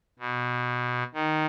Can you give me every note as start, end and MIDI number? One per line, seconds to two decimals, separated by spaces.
0.20 1.04 47
1.14 1.46 51